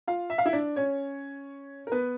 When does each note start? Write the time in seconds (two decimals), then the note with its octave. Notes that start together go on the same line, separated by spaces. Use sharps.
0.07 F4 F5
0.30 E5
0.38 F5
0.46 E4 E5
0.53 D4 D5
0.76 C#4 C#5
1.87 A#4
1.92 B3 B4